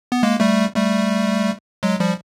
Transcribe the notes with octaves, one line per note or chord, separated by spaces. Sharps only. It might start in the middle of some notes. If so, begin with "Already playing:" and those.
B3
G#3 A#3
G3 A3
G3 A3
F#3 G#3
F3 G3